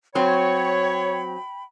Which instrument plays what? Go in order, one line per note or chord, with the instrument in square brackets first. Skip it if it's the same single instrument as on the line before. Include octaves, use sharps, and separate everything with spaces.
[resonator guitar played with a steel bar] F#3 C4 [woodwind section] C#5 [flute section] G5 B5